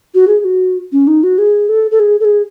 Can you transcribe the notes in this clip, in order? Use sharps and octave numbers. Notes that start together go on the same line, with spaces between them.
F#4
G#4
G#4
F#4
C#4
D#4
F#4
G#4
A4
A4
G#4
A4
G#4